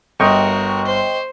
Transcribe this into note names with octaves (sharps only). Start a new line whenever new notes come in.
G1 F#4 A#4 D#5 G5 C#6
C5